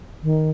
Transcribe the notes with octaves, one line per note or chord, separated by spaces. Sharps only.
D#3